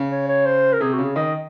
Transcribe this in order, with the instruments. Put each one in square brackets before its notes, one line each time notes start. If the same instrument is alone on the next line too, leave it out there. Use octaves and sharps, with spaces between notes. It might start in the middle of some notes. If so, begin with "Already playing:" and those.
Already playing: [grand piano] C#3
[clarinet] C#5
C#5
C5
A#4
[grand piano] C3 [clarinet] G#4
[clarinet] F#4
[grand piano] C#3
[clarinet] G#4
[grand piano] D#3 [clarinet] D#5